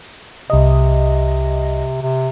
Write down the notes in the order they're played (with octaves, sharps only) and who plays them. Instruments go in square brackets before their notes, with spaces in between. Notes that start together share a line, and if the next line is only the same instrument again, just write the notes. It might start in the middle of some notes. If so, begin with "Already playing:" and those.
[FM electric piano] C2 D#5 [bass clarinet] C3
[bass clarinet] C3